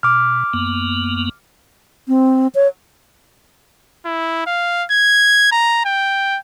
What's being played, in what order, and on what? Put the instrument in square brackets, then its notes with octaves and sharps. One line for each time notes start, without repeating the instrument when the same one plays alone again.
[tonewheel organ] B2 [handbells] D6 F6
[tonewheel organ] F#2 A#3 B3
[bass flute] C4
C#5
[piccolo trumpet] E4
F5
G#6
A#5
G5